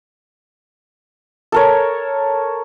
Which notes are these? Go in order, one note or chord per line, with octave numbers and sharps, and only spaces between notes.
A4 A#4 C#5